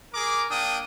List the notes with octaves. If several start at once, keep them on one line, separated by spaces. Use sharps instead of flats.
G#4 A#4 D6
A#3 D4 G5 D#6